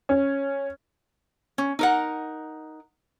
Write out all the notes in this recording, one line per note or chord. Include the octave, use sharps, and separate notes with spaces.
C#4
C#4
D#4 A#4 F#5